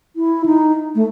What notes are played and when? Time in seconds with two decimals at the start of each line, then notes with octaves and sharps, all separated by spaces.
0.16 E4
0.46 D#4
0.95 A3